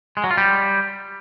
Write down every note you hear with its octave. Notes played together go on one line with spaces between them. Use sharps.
G#3
F#3
F4
G3